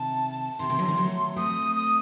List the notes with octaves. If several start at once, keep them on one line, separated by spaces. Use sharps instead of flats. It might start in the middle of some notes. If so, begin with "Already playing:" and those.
Already playing: C3 D#3 A5
C3 D#3 C6
C3 D#3
D3 F#3
D#3 G3
F#3 A3
A3 C4 D#6
D#6